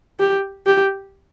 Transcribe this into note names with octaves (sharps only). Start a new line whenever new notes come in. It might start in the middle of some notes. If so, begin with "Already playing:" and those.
G4
G4